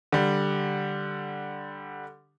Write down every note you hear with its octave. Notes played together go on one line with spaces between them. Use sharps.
D3 G3